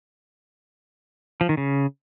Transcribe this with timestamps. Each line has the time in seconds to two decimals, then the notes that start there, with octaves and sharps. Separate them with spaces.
1.41 F3
1.49 D#3
1.57 C#3